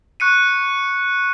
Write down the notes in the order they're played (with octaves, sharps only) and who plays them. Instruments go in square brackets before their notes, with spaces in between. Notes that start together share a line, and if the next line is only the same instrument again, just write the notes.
[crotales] C#6 F#6 C#7 D#7